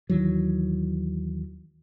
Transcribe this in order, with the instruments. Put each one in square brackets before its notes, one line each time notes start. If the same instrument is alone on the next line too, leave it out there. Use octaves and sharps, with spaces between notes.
[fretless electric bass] D#2 D#3 E3 F#3